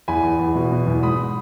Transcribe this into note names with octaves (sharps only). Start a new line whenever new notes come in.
E2 G#5 B5
E2
E2
B2
B2
E2
G#2 B5 D#6